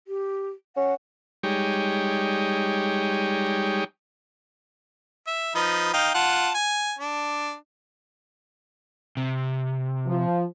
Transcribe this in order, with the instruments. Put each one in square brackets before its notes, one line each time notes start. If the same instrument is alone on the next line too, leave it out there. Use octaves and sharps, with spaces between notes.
[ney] G4
[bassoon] C#4 [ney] F#5
[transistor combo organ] G3 G#3 D#4 G4 C#5
[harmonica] E5
F3 D#4 B4
D#4 F5 G5
F4 F#5 A5
G#5
D4
[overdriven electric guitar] C3
[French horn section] F3